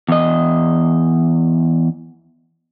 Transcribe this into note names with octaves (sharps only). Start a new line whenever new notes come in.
E2 D#5